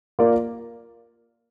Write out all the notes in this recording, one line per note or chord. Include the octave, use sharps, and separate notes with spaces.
A#3 F4 A#4 D5